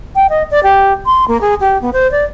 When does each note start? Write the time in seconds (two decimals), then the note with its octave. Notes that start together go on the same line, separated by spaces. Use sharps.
0.15 G5
0.29 D#5
0.51 D5
0.63 G4
1.06 C6
1.28 A#3
1.41 G#4
1.60 G4
1.81 B3
1.93 C5
2.11 D5